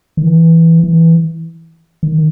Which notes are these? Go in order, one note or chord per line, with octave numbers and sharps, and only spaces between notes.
D#3
E3
E3
D#3